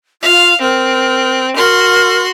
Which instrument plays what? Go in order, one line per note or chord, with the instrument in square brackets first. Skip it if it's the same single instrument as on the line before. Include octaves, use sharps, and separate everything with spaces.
[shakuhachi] F4 [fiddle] F5
[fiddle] C4 [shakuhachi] A#4
[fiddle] F#4 C6 [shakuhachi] A#4